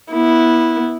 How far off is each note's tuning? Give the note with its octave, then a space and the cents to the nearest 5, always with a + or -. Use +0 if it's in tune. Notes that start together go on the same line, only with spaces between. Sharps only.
B3 -20 E4 -10